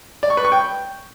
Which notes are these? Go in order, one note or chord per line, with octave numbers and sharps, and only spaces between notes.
D5
C#6
B4
C#6
G5